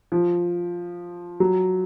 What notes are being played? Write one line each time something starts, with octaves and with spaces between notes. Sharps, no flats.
F3
F#3